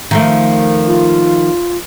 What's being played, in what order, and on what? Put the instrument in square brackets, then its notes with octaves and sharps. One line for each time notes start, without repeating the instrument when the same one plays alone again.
[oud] D#3 F3 A3
[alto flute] F4